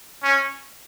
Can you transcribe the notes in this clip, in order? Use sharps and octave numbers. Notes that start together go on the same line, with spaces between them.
C#4